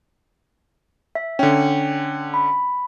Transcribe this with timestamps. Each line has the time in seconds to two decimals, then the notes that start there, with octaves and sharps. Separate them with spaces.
1.15 E5
1.39 D3 C#4 G5
2.34 B5